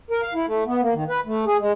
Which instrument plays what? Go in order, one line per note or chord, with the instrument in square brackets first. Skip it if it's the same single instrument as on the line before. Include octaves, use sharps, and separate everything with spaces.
[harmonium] A#4
F5
E4
A3
B3
A#3
D#3
B4
A3
G#4
G#3